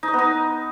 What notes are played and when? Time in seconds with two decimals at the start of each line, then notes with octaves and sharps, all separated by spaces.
0.03 D#4
0.08 D#5
0.13 B3
0.19 D#4